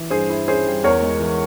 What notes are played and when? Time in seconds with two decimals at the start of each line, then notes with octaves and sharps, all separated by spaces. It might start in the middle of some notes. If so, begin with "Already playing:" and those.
Already playing: E3
0.10 G2 G#4 C5
0.30 E4
0.47 C#4 G#4 C5
0.66 G3
0.84 E2 A#4 C#5
1.03 G#3
1.20 E3